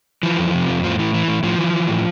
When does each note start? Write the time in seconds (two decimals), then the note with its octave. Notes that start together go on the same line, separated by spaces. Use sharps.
0.23 E3 F3
0.38 F2
0.54 C3
0.69 F2
0.84 A2 F3
0.99 E3
1.14 E3
1.28 A2
1.43 A2 F3
1.59 E3
1.73 E3
1.88 A2